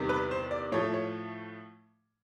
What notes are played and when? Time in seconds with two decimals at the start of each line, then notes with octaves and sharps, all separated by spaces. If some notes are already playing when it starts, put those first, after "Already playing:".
Already playing: E2 C3 D#3 G3
0.09 B4
0.31 C5
0.51 D5
0.72 A2 F3 A3 C#5
0.94 C#5